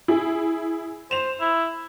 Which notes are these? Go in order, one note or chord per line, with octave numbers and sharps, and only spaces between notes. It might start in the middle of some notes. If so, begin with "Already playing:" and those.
E4 G#4
C5 E7 F7
E4